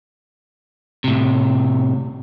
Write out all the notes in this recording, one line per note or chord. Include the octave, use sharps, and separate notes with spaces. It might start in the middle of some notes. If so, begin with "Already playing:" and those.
A2 C3